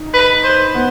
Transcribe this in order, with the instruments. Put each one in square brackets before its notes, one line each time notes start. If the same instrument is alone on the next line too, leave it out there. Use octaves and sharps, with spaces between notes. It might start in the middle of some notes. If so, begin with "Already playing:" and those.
Already playing: [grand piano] D#4
[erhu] B4
C5
[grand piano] B3